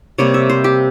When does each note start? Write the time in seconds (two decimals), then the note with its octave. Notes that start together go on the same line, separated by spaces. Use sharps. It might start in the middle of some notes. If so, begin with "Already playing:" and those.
0.18 C3 G3 A#3 C#5
0.34 E5
0.50 C5
0.64 G4